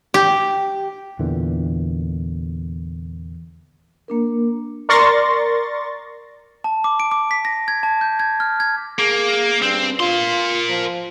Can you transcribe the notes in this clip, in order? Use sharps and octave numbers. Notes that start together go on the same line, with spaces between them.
G4
E2 A#2 D3 E3
A#3 D4 A#4
A#4 D5 C6 C#6 A6 A#6
A5
D6
D7
D6
B6
A#6
G#6
A5
G6
G#6
F6
G#6
A#3 G#4
G2 C4
F4 A#4 C6
F3